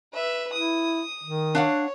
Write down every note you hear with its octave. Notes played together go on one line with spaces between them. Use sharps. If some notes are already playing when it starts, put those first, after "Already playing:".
B4 E5
E4 D#6
D#3
D4 C#5 F5 F#5